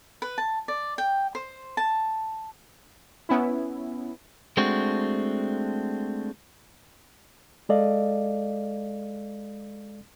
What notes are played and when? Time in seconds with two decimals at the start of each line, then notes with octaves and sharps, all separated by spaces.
0.22 B4
0.38 A5
0.68 D5
0.98 G5
1.35 C5
1.77 A5
3.29 B3 C#4 E4
4.57 G#3 A3 C4 D4 F#4
7.69 G#3 A4 D5 D#5 F5